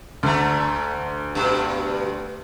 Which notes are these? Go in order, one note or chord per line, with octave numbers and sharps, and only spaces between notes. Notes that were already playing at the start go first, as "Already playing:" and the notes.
D2 D3 A3 A#5
G2 B2